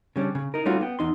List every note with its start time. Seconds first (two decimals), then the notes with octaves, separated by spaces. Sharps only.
0.16 C#3 G3 C#4 D4
0.35 C#3
0.54 D#4 A#4
0.65 G3 A3 C#4 D#4 F4 F#4
0.81 B3 G5
0.99 E2 D#4 C6